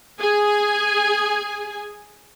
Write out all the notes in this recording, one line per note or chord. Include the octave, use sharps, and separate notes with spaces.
G#4 G#5